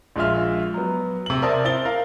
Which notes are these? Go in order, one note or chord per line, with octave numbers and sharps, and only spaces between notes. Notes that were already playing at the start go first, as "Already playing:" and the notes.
A#1 G#3 F4 E5 F6
F#3 B3
C3 F#7
A#4 C5 D5 E5 A5 D#6
C4 E4 A6 G7
A#4 F5